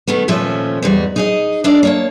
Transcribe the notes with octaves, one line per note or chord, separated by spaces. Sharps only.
B2 D#3 A3 B3
D#2 A#2 F3 A3 C#4 E5
E2 G#2 G3
D#4 G#4 D#5
D4 G#4 A#4 D5 E5
A#3 C#5 A5